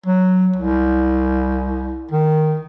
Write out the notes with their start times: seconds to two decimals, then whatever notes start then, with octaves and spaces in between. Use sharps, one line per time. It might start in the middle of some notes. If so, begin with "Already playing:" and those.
0.06 F#3
0.56 C2
2.11 D#3